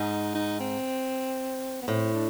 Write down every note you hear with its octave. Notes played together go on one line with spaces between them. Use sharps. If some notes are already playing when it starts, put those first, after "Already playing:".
Already playing: G#2 D#4
D#4
C4
B3
A2 C4
D4